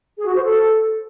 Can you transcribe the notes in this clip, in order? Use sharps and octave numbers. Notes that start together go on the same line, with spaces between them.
G#4
F#4
C5
A4